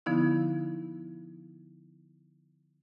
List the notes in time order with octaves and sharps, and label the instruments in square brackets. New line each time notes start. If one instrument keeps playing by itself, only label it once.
[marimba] D3 F3 B3 D#4 E4